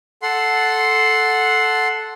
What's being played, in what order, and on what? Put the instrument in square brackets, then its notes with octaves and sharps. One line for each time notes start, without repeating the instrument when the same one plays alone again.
[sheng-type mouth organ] A4 F#5 C6